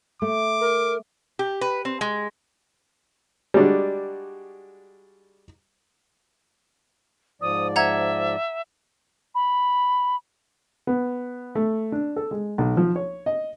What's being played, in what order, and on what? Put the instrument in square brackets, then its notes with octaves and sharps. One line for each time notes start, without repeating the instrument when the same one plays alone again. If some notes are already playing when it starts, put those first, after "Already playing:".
[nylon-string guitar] A3 [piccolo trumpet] D6
[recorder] A#4
[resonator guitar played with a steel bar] G4
B4
C4
G#3
[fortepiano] G3 G#3 D4 F#4
[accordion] G#2 F3 D5 [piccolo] D#6
[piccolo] E5 [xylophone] F#5 A#5 G#6
[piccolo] B5
[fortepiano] B3
A3
D4
A4
G#3
B1
F3
C#5
D#5